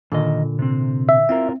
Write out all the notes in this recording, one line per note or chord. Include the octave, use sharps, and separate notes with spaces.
A#2 D3 D#3 D#5
C3 C4
E5
C4 E4 F4 A#4